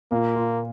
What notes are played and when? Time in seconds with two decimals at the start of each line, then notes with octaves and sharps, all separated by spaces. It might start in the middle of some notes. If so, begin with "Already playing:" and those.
0.11 A#2 A#3
0.35 F4